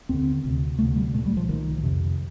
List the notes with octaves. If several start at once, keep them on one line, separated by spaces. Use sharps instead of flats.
D#2 D3 C4
D2 C3
D2 C3 A3
G3
C2 A#2 A3
G3
F3
C2 A#2 D#3
F2 C3